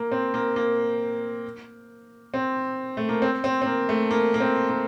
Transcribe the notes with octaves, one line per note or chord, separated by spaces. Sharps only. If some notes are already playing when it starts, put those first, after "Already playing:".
Already playing: A#3
C4
A#3
A#3
C4
A3
A#3
C4
C4
C4
A#3
A3
A#3
A#3
C4
A#3